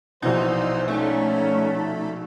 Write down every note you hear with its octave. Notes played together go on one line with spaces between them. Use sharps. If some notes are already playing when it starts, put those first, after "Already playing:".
A#1 B2 E3 D#4 C5
A3 C#4 D#4